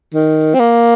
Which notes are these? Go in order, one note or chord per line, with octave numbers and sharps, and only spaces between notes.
D#3
C4
A#3